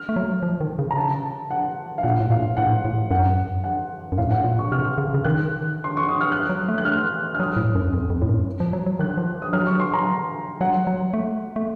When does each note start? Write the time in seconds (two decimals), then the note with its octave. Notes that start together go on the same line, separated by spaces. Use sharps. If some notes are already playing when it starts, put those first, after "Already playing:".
Already playing: F6
0.09 A3
0.16 F#3
0.42 F3
0.61 D#3
0.79 C#3
0.91 A#5
0.97 A5
1.51 F#5
1.98 F5
2.03 A#2 F#5
2.20 A2
2.30 A#2 F5
2.57 A2 F#5
2.85 A2
3.11 F#2 F#5
3.64 F#5
4.12 F#2
4.18 A2 F5
4.31 F#5
4.44 A#2
4.59 C#6
4.71 C3 F6
4.98 C#3
5.14 C#3
5.24 D#3 F#6
5.84 C6
5.97 C#6
6.09 D#6
6.21 F6
6.32 F#6
6.49 F#3
6.68 A3
6.78 F#6
6.85 F6
7.35 F6
7.40 F#3 D#6
7.56 A2
7.75 F#2
7.93 F2
8.10 F2
8.22 A2
8.29 F#2
8.60 F3
8.73 F#3
8.86 F#3
8.99 D#3 F#6
9.18 F3
9.42 D#6
9.53 F#3 F6
9.67 C#6
9.80 C6
9.94 A#5
10.61 F#3 F#5
10.87 F#3
11.13 A3
11.56 A3